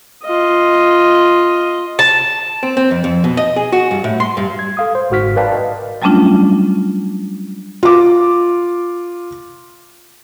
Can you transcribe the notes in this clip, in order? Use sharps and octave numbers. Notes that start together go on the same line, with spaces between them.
F4 D#5
A5
C4
C4
F2
F2
B2
D#5
G#4
F#4
G2
A2
C6
G2
G#6
A4 F5 D#6
C5
G1 G#2 F#4 F6 B6
A#4 B4 D5 F5 G5 A5
D#5
F#3 G3 A3 C#4 D4 F4
F4 D6